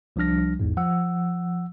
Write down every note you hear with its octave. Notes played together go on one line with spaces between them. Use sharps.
C2 F3 G3 D4 F6 A#6
A1 E2 G#2
F3 F#5 E6